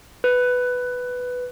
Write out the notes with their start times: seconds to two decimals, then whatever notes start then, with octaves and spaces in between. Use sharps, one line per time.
0.24 B4